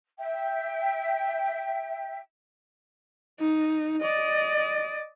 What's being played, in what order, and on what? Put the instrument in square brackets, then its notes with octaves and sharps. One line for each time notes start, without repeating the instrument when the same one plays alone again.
[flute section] E5 G5
[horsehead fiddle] D#4
D5 D#5